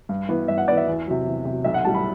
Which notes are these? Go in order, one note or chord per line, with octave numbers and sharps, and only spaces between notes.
G2
E3 B3
G2 E5
F#5
E3 B3 D5
E5
E2
C3 F#3
E2
C3 F#3
B1 E5
F#5
A2 G3 A5
B5